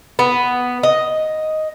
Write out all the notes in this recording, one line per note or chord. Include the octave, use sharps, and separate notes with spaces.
B3
D#5